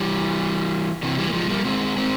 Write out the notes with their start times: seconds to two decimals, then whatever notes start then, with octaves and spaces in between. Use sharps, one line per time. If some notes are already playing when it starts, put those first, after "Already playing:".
Already playing: E3 G3
1.03 C3 E3
1.18 E3 G3
1.29 A#3
1.33 F3 G#3
1.50 G3 A#3
1.65 G#3 C4
1.97 G#3 C4